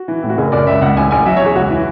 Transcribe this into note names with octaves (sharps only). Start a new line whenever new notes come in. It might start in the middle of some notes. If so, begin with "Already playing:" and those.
Already playing: F#4
E3
A2
F#4
F#1 G#4
F#1 D5
C#2 E5
C#2 F#5
A1 G#5
A1 G#5
F#3 E5
C#5
E2 G#4
C#2 F#4
E3